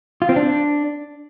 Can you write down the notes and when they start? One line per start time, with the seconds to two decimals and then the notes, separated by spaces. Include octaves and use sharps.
0.22 F4
0.29 C4
0.36 D4